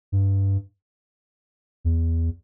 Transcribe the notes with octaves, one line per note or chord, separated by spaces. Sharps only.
G2
E2